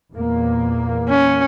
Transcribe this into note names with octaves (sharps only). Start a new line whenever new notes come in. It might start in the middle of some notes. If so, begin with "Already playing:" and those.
E2 A#2 A#3
C#4